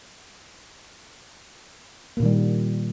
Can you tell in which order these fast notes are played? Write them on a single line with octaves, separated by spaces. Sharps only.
A#3 A#2 D#3 G3